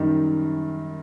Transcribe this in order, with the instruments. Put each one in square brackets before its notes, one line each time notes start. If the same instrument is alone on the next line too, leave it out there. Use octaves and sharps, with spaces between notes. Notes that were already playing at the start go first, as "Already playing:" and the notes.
Already playing: [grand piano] F#2 D#3 G3